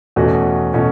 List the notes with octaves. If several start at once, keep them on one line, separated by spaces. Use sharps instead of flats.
E2 B2 A3 C#4 F#4
B2 A3 C#4 F#4